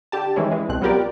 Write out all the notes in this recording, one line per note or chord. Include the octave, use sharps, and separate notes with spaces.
D3 G4 A5
D#3 E3 G3 G#3 C#4 E4
E3 G#3
C2 B2 C4 F#6
F#3 B3 F4 G4 A#4 D5